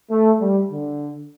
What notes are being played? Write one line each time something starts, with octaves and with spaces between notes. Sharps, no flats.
A3
G3
D3